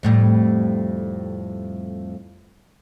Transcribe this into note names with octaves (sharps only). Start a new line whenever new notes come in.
F2 A2 G3